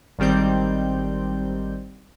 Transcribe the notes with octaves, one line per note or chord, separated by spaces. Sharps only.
G#1 D#3 G3 C4 G6